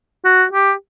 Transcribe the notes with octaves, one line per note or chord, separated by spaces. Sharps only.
F#4
G4